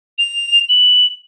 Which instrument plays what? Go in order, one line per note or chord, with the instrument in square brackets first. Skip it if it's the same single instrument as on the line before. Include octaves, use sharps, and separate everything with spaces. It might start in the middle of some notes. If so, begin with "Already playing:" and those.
[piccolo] F7
F#7